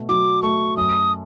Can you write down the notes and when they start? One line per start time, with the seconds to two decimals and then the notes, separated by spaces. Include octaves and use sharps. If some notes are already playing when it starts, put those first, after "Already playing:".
Already playing: B2 A3
0.09 F#3 D6
0.42 A3 C#6
0.77 F#2 D#6